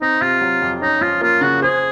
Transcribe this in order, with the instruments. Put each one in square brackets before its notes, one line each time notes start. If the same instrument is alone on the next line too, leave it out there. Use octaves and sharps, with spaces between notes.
[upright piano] C4 [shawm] D#4
[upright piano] C3 [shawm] F4
[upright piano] F#3
F2
[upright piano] C#4 [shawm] D#4
[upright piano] F3 [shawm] F4
[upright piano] A#3 [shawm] F4
[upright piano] C#3 [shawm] F#4
[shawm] G#4 [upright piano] C5